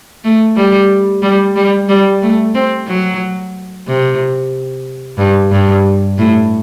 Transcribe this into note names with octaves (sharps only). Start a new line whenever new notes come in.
A3
G3
G3
G3
G3
A3
C4
F#3
C3
G2
G2
A2